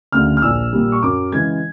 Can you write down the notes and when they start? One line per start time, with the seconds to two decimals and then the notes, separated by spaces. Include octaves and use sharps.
0.12 D2 C#3 F6
0.37 F6
0.42 A#1 E6
0.73 A#2 G3
0.92 C#6
1.03 F#2 D6
1.32 C#3 E3 G#3 G#6